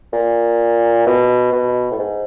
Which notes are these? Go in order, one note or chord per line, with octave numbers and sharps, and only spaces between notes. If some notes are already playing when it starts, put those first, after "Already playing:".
A#2
B2
B2
A2
G#2